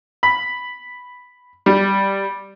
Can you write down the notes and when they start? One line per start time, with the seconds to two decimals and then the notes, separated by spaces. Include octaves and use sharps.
0.23 B5
1.66 G3